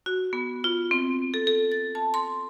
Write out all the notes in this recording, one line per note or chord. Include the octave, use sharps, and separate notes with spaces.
F#4
B3
F4
C4
A4
A4
A6
A5
C6